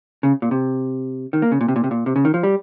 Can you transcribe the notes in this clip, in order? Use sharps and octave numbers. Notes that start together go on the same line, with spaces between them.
C#3
A#2
C3
D#3
A#3
C#3
A#2
C3
A#2
C3
A#2
C3
C#3
D#3
F3
G3